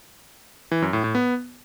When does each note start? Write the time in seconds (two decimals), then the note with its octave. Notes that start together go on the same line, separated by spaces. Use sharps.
0.72 E3
0.82 F#2
0.93 A2
1.04 A2
1.15 B3